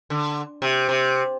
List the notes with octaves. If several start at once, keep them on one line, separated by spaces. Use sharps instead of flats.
D3
C3
C3